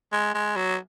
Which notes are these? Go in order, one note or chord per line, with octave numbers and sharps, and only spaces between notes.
G#3
G#3
F#3